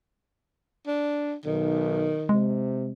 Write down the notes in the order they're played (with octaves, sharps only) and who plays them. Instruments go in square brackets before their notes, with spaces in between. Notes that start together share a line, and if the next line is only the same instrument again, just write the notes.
[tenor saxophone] D4
[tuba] B1 [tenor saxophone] D#3
[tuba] C3 [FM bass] G#3